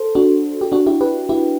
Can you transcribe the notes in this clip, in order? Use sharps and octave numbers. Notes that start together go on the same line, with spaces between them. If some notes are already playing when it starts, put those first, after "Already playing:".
Already playing: A4 C5
D4 F#4
G4
D4 F#4
E4 G4
G4 B4
E4 G4